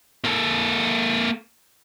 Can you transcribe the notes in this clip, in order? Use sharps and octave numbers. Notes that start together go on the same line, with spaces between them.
A#3 A4